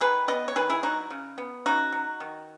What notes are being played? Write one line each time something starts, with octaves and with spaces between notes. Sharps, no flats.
D#3 G#4 B4
B3 B4 D#5
C#5
D#3 G#4 B4
E4 G#4
F#3 D#4 F#4
C#3
B3
C#3 D#4 F#4
F#3
D#3